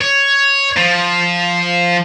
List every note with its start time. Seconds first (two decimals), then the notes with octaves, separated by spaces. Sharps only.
0.01 C#5
0.77 F3